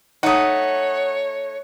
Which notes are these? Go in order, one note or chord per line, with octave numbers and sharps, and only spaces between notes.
A3 D#4 C#5 F#5 D#6